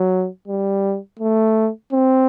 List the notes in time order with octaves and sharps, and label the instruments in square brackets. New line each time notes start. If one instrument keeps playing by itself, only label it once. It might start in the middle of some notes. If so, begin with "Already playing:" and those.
Already playing: [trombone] F#3
G3
A3
C4